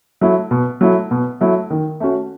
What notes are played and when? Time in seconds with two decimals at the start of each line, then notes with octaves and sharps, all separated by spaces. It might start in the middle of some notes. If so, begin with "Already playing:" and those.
0.21 F#3 A3 E4
0.51 B2
0.81 F#3 A3 E4
1.11 B2
1.41 F#3 A3 E4
1.70 D#3
2.00 A3 C#4 F#4